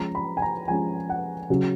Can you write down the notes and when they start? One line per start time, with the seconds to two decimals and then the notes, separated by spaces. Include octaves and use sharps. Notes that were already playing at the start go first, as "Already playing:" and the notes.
Already playing: F3 G#3 C#4 A#5
0.15 B5
0.37 G#5
0.42 A#5
0.68 F3 G#3 C#4 G#5
1.09 F#5
1.50 C#3 F#3 C#4